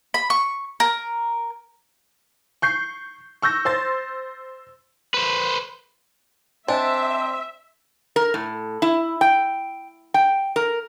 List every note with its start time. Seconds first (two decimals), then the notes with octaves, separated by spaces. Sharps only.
0.14 B5
0.30 C#6
0.80 A#4
2.62 C#6 G6 C7
3.42 C#6 E6 G6 A#6
3.65 C5 C6 A6
5.14 B4 C5
6.68 C4 D4 C5 D#5 E5 G#5
8.16 A#4
8.34 A2
8.82 E4
9.21 G5
10.14 G5
10.56 A#4